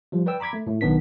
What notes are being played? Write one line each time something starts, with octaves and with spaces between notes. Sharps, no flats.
F3 G3
B4 D5 G5 E6
A#5 B5 D6 G#6 B6
A3
A2 A3
B1 D#3 B3 D4 B4 B6